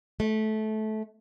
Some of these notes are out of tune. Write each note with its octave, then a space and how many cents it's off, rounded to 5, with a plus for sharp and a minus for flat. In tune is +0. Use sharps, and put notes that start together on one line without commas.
A3 -20